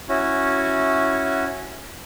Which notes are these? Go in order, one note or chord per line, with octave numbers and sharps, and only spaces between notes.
C#4 E4 F#4